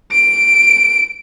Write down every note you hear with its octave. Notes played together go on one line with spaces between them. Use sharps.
D7